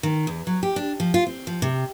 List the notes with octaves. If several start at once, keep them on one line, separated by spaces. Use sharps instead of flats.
D#3
E2
F#3
G4
D4
F3
F4
C4
F3
C3